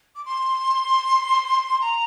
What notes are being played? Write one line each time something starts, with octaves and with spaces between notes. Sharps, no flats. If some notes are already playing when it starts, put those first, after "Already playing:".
D6
C6
A#5